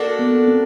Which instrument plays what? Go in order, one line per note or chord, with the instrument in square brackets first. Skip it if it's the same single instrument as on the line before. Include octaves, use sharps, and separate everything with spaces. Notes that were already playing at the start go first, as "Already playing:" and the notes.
Already playing: [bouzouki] A#3 D4 F#4 A4
[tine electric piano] B3
C4